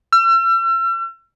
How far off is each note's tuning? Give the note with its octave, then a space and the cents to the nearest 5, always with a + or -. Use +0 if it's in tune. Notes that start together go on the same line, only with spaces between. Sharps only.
E6 +45